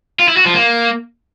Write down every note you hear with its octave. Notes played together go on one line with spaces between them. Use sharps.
F4
E4
F#4
F3
A#3